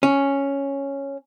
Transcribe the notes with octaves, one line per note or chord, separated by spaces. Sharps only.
C#4